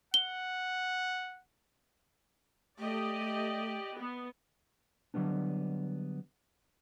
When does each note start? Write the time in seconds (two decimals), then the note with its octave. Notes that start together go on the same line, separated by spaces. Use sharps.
0.14 F#5 G7
2.79 A3 G4 D5 D#5
3.95 B3
5.14 D3 F#3 G3 B3 D4